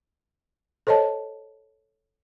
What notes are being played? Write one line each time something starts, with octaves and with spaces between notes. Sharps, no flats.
A4 C5 C#5 D#5 A5